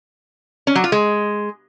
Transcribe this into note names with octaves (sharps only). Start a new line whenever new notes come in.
C#4
F#3
F4
G#3